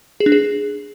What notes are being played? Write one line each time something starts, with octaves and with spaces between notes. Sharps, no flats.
G#4
D4
G#4